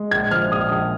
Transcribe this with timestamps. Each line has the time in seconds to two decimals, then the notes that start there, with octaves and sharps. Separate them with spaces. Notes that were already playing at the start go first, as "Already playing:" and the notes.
Already playing: G#3
0.11 A#1 G#6
0.31 F3 F6
0.52 A#1 D#6
0.71 A#1